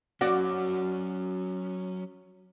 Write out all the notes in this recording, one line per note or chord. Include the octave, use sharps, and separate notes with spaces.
F#3 C#4 F#4 D5